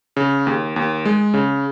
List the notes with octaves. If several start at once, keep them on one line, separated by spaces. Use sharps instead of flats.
C#3
D#2
D#2
G#3
C#3